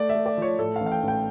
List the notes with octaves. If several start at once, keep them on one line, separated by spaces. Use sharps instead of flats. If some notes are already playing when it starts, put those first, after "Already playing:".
Already playing: A3 D5
E5
A3
D5
F3 C#5
A2 A4
F5
A1
F5
G5
A1
G5